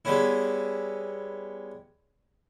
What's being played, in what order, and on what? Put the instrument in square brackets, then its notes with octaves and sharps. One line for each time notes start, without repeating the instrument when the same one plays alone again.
[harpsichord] G3 G#3 B3 C#4 E4